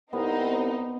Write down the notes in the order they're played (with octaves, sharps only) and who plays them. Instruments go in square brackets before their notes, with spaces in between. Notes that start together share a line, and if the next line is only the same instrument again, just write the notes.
[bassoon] C2 [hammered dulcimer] B3 [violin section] C4 D#4